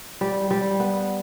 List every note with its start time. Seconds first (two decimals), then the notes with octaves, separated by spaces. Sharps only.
0.21 G3
0.51 G3
0.80 B3